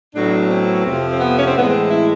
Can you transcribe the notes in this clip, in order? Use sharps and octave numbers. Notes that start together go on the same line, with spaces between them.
A2 F#3 B3 D4
C4
F2 C3 F3
C4
B3
C#4
C4
A2 E3 G#3 B3
C4
E4